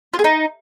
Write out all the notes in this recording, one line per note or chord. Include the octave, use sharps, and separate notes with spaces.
F4
G#4
D#4